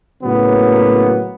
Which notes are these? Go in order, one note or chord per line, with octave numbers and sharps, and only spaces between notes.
A2 C#3 F#3 A#3 B3